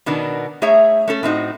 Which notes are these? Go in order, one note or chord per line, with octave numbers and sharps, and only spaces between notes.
B2 D#3 B3 D4
A3 G#4 C#5 E5 A#5
A3 C#4 A4
A2 C4 D#4 F#4